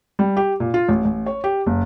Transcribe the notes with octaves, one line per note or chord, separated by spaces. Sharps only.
G3
G4
A#2
F4
A1
A1
C#5
G4
F#1